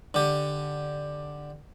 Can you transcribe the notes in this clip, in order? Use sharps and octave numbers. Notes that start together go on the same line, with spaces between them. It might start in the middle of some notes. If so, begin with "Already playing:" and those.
D3 G4